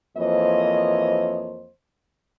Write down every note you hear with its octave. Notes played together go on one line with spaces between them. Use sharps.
F2 E3 A#3 C5 C#5 D#5